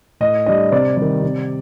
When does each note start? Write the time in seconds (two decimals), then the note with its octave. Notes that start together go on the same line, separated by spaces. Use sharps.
0.20 A2 D#5
0.46 G3 D4 D#5
0.72 C3 D5
0.97 D#3 G3
1.22 C3